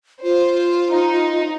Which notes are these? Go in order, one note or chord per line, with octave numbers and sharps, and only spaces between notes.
F4 C5
D#4